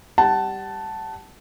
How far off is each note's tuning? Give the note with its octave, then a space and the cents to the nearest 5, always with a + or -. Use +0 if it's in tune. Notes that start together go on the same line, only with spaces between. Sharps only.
G3 +0 F#5 +30 A5 +0